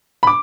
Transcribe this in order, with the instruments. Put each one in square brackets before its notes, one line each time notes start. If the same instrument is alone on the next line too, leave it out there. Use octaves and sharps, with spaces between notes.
[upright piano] B5
D6